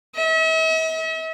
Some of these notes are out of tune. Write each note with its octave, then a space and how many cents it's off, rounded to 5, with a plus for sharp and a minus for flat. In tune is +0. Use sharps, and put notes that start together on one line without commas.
E5 -45